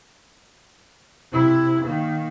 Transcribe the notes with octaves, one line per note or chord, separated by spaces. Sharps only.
C3 E4
D#3 A#3